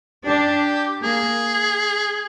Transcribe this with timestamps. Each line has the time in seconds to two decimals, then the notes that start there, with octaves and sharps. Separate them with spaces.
0.26 D4 G4
1.03 A#3 G#4